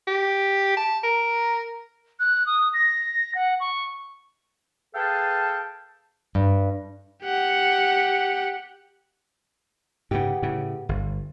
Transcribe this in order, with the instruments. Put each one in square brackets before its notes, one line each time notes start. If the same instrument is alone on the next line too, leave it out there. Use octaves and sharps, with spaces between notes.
[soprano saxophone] G4
A5
A#4
[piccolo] F#6
D#6
A#6
F#5
C#6
[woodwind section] G#4 A4 B4 F5 G5 A5
[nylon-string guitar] G2
[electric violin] G4 F#5
[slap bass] G#2 C#3 [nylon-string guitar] B3 G4
[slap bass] A2 C#3
G1